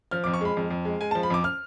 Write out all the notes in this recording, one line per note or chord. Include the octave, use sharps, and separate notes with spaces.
F3 F6
F2 D6
C#6
G#3 B5
F2
F2
G#3
G#3 G#5
A5
F3
B5
F2 D6
F6